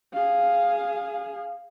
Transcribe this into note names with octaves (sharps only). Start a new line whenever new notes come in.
G#4 F5